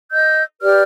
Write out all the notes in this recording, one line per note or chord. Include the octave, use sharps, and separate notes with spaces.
D#5 E6 G6
G4 B4 D5 F6